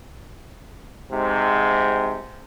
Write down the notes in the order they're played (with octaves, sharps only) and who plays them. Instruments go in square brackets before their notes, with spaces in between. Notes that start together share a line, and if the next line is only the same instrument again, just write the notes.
[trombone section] G#2 C3